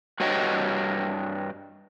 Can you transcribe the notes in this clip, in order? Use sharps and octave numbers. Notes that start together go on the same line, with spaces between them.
G2 F#4 C#5 D#5 G5